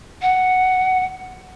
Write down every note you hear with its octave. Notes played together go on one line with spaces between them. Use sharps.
F#5